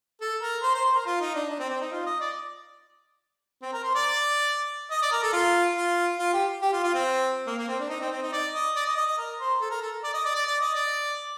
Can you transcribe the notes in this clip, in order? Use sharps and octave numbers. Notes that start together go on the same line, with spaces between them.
A4
A#4
C5
C5
C5
A#4
F4
D#4
D4
D4
C4
C4
D#4
F4
D#5
D5
C4
A#4
C5
D5
D#5
D5
A#4
A4
F4
F4
F4
G4
G4
F4
F4
C4
A#3
A#3
C4
D4
D#4
C4
C4
D#4
D5
D#5
D5
D#5
D#5
D#5
A#4
C5
A4
A#4
A4
D5
D#5
D5
D5
D5
D#5
D5